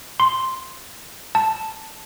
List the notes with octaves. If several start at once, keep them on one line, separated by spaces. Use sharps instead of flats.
C6
A5